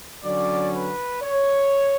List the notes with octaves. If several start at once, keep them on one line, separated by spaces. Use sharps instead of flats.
D3 F#3 C#4 D5
B4
C#5